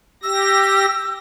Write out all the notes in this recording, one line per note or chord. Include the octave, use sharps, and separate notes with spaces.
G4 E6 A#6